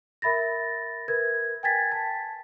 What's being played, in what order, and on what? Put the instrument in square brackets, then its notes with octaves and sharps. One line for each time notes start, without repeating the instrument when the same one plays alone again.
[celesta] A#4 E5 B5 A6 A#6
A#4 B4 G#6
G5 G#5 G#6 A6 B6
A5